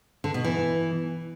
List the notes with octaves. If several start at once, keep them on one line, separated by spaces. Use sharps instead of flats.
D3
B2
E3